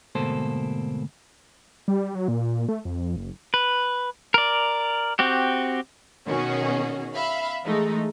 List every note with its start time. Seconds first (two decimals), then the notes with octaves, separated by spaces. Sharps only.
0.15 D2 G#2 B2 A#3 A4 C5
1.88 G3
2.15 F#3
2.28 A#2
2.69 A3
2.85 F2
3.16 F#1
3.54 B4
4.34 A#4 D5
5.19 C4 F#4 G4
6.27 B2 D#3 C#4 F#4 G#4
7.13 E5 F5 B5
7.64 E3 G#3 A3 D#4